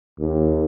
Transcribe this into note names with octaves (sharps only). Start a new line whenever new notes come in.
D#2